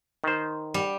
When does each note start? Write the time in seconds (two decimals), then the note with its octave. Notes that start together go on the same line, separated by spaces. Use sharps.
0.24 D#3 C5
0.74 G3